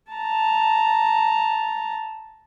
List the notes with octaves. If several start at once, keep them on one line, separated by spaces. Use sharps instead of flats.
A5 A#5